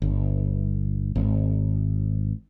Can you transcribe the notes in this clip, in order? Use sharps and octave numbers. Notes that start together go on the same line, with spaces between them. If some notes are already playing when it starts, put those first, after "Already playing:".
G1
G#1